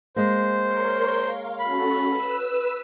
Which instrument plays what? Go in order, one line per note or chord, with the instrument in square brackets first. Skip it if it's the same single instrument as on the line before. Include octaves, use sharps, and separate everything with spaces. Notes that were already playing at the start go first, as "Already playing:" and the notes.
[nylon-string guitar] G#3 A#3 [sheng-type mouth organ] C5
[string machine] A#4 C#5 C6
F5
[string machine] C#4 F#4 A4 [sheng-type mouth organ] B5
[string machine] B4 E6